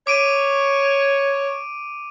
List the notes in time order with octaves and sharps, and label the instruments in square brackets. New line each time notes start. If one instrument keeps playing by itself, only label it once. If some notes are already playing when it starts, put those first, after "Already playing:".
[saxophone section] C#5 [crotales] D6 D7 D#7